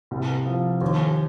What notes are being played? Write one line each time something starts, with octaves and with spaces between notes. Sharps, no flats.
C2
F3
D#2